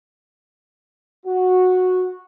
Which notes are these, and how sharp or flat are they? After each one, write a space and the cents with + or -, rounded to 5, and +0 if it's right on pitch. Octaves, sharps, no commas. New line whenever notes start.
F#4 -10